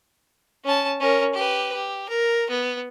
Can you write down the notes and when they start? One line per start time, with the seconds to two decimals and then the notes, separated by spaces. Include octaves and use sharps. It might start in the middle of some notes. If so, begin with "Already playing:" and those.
0.64 C#4 A5
1.00 C#4 A#4
1.34 G4 B4
1.73 G4
2.09 A#4
2.50 B3